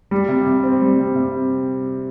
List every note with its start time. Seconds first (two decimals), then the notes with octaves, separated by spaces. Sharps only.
0.11 G3
0.29 C3
0.47 C3
0.64 C4
0.81 G3
0.99 C3
1.15 C3